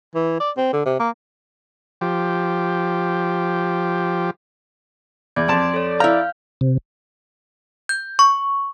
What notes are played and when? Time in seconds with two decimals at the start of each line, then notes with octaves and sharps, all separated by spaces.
0.15 E3
0.39 D5
0.57 C4
0.73 D3
0.85 C3
0.99 A#3
2.01 F3 G4
5.36 E2 D5 G#6
5.48 F2 A5 C6 D7
5.74 A4 C#5
6.00 E4 F5 A#5 F6 G6
6.61 C3
7.89 G6
8.19 C#6